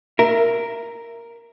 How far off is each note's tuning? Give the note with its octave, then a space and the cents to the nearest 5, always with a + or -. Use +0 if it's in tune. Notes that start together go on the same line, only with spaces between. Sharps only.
A#4 +0 E5 +20